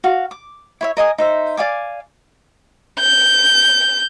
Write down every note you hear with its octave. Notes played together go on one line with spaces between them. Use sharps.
F#4 F5
D6
E4 C#5 E5
A#4 D#5 G#5 D#6
D#4 C5 E5
D5 F5 G#5 D6
G6